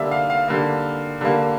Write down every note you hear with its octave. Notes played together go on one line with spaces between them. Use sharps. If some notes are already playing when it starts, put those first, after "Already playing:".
Already playing: D3 G3 A#3 D5 E5
F5
F5
D3 G3 A#3
D3 G3 A#3